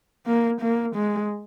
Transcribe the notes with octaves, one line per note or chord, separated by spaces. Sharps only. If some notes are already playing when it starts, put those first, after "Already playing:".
A#3
A#3
G#3